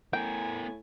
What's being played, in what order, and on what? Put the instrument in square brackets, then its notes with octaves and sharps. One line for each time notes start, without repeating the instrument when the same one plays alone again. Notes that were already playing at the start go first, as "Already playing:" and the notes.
[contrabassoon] A2 [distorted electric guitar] B3 A#4 [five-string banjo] G5 [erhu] G#5